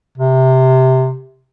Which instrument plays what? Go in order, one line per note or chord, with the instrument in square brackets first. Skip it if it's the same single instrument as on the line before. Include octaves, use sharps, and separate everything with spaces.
[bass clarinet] C3